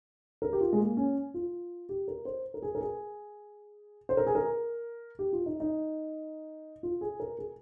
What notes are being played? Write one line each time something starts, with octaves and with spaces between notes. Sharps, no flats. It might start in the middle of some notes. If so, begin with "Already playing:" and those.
A#4
G4
F4
G#3
A#3
C#4
F4
G4
A#4
C5
A#4
G#4
A#4
G#4
C5
A#4
G#4
A#4
G4
F4
D#4
D#4
F4
G#4
A#4
G#4